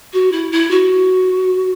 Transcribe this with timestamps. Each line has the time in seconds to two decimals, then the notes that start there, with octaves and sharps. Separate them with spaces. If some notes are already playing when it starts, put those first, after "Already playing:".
0.13 F#4
0.32 E4
0.52 E4
0.70 F#4